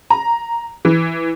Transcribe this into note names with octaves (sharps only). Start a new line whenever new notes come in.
A#5
E3